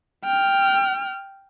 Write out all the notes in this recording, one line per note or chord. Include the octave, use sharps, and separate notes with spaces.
G5 F6